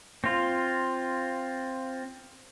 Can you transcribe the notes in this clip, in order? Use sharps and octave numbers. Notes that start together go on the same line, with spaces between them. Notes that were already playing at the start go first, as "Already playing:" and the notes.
C4 F4